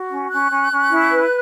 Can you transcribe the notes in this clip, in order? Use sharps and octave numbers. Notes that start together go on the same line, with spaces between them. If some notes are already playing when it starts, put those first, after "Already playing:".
Already playing: F#4
C#4
C#4 F#6
C#4
C#4
E4
B4